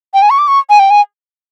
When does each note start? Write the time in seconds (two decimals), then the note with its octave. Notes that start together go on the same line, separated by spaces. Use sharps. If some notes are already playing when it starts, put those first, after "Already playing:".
0.14 G5
0.22 G#5
0.30 C#6
0.39 D6
0.48 C#6
0.70 G#5
0.79 G5
0.90 G#5